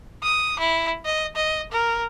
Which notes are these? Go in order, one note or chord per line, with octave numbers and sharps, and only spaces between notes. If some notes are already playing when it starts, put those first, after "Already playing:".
D#6
E4
D#5
D#5
A#4